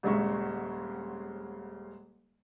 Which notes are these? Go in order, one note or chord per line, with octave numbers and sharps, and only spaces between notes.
D#1 G#1 C#3 G#3 E5 C#6